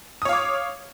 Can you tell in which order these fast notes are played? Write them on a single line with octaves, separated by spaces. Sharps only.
D#6 C#5 F5 D6